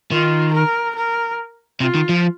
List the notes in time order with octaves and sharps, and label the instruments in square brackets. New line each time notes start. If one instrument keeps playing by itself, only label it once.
[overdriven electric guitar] D#3 [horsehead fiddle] F4
[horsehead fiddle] A#4
A#4
[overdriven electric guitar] C3 [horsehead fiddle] F4
[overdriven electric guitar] D#3
F3